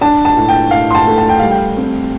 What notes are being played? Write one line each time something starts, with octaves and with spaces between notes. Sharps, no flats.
D4 A5
A5
A2
G5
A2 F5
C6
A5
A3
A5
G5
G3 F5
G5
C4